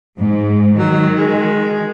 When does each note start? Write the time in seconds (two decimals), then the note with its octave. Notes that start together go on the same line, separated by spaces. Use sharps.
0.18 G#2
0.79 D#3 F#3
1.18 G#3